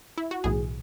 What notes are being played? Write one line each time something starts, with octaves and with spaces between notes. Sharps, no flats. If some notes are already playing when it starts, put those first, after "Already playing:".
E4
F#4
B1 A2 E3 G#4